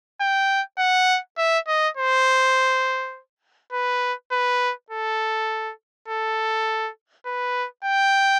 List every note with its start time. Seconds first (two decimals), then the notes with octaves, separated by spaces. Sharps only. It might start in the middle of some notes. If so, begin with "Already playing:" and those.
0.21 G5
0.78 F#5
1.38 E5
1.68 D#5
1.97 C5
3.73 B4
4.32 B4
4.90 A4
6.08 A4
7.26 B4
7.85 G5